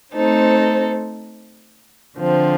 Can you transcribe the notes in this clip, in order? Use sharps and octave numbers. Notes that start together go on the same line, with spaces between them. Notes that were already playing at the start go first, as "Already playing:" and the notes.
A3 C4 D#4 A4 C5
D3 F3 C4